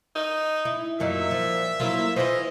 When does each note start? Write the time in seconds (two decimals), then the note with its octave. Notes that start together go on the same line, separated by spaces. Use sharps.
0.16 D#4
0.65 E4
1.00 F#2 A#2 F#3 D#4 E5
1.31 F3
1.80 F#3 A#3 E4 F4
2.16 E3 E4 F4 C5 D#5